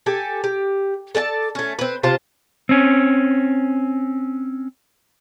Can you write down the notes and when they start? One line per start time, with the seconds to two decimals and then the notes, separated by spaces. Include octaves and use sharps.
0.06 G4 A4 G#5
0.44 G4
1.15 A4 D5 G#5 A5
1.55 A3 C#4
1.79 C4 B4
2.03 C3 F4 C5 A5
2.69 C4 C#4